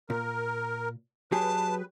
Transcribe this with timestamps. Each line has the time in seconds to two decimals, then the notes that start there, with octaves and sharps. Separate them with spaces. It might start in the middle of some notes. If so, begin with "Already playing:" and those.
0.10 A#2 A#4
1.32 F#3 G4 G#4 B4 A5